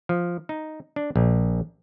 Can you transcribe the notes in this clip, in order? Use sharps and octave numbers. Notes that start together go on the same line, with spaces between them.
F3
D#4
D4
A#1